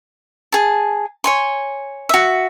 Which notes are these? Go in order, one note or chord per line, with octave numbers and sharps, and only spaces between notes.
G#4 A5
C#5 G#5 C6
F#4 E5